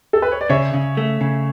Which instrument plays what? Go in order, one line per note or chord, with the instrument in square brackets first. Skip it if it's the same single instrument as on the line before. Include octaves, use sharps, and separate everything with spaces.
[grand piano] A4
B4
C#5
D5
[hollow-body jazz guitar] C#3 [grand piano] C#5 E5
[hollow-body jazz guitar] C#3
A3
C#3